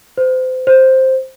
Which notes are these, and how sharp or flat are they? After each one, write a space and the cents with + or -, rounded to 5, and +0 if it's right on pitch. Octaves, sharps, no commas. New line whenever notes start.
C5 -30
C5 +5